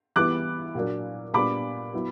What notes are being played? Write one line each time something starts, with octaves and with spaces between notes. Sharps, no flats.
E3 G3 B3 E4 D6 F#6
A#2 F#3 A#3 D4
A#2 G3 B3 D4 B5 D6
F#3 B3 E4